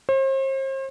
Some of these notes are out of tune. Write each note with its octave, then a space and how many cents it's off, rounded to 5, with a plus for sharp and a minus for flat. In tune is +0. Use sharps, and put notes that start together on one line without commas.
C5 +40